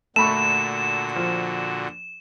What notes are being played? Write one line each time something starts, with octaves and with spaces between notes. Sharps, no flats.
A#2 D3 A3 F#4 B5 C#6 E7
F3